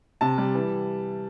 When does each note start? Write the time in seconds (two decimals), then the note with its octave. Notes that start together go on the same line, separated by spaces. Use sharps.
0.21 C3 A5
0.38 G3
0.55 E3